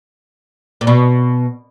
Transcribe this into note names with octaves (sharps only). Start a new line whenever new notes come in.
A#2
B2